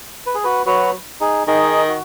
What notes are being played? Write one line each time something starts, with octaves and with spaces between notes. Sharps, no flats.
B4
G#4
F#4 B4
F#3 F#4 B4
D#4 G#4
D#3 D#4 G#4
F#4